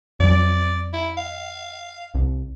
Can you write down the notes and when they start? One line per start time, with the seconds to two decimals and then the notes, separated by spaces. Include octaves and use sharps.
0.20 F2 F#3 D5
0.93 E4
1.17 F5
2.15 C2